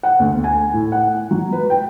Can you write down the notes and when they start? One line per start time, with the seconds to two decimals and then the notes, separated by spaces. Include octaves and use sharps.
0.03 F#5
0.19 D2
0.44 G#5
0.73 A2
0.92 F#5
1.31 F#3
1.53 B4
1.70 G5